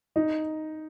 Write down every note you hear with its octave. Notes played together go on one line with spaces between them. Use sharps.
D#4